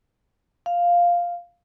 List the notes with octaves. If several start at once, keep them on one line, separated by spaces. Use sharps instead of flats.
F5